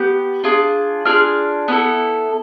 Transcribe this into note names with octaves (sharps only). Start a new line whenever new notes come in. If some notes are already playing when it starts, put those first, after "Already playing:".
Already playing: B3 G4
D4 F4 G#4
D4 F4 G#4 F6
B3 E4 A4